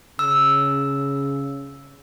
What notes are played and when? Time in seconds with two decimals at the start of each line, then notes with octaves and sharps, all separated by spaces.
0.19 C#3 E6